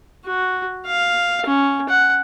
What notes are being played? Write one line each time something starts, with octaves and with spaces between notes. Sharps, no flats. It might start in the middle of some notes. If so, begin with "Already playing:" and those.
F#4
F5
C#4
F#5